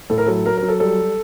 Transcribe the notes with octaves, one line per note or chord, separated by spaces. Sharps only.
A2 A4
A#4
F#3 A4
F#3 A#4
F#3 A#4
A4
G3 A4
G3